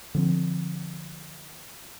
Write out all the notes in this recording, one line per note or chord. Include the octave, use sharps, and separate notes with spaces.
D3 F3 C4